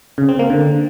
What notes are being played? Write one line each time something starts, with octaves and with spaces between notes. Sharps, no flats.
C#3
C4
A#3
D3